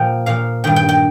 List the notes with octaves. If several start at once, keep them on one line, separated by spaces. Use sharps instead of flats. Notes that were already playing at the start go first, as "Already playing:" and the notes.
Already playing: A#2 F3 G5
A#2 F3 F5
G2 D#3 G5
G5
G5